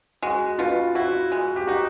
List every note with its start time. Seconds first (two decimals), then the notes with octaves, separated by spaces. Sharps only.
0.22 G#3 F#4
0.59 B2 F4
0.95 E4 F#4
1.32 G#3
1.56 G4
1.67 D#4 F#4